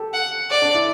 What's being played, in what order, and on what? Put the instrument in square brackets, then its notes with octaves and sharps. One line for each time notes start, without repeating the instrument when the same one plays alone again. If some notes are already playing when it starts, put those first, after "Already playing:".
Already playing: [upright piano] G4 A4
[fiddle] F#5
D5
[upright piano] D4
E4